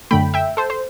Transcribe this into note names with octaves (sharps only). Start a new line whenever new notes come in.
F#2 D3 A3 G5 B5
E5 G5
A4 C5
C5